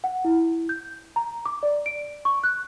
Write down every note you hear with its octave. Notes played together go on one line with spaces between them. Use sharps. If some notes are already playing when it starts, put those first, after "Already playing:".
F#5
E4
G6
A#5
D6
D5
D7
C#6
F#6